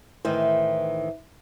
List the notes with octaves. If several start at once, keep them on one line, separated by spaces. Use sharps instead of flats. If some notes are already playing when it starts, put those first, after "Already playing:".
A2 D#3 E3 C5